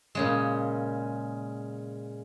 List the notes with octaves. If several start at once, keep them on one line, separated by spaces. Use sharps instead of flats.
A#2 C#3 G#3